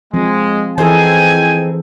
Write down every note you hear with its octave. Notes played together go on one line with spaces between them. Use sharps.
F3 G#3 C4
E3 C4 D#4 G#4 A4 G5 G#5